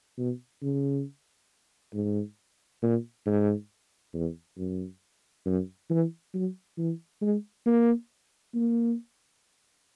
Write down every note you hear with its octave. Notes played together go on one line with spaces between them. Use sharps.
B2
C#3
G#2
A#2
G#2
E2
F#2
F#2
E3
F#3
E3
G#3
A#3
A#3